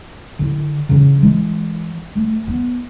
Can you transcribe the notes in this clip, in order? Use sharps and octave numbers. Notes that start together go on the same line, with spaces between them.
D3 E4
C#3 E3
E3 G#3
A3
B3